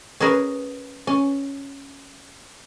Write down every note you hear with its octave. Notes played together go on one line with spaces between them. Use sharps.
C#4 G#4 A#4 B4
C#4